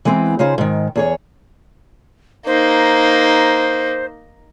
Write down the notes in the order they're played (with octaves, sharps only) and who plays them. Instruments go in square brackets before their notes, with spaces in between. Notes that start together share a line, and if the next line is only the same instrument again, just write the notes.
[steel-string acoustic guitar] E3 G#3 B3 C4
C#3 D#4 F4 G#4 C5
G#2 D#3
E2 G#4 C#5
[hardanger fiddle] A#3 D#4 [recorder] C5